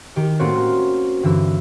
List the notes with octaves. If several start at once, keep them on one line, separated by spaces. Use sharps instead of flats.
D#3 G4
A2 A3 A#3 C4 C#4 F#4
A#3
G2 D3 E3 E6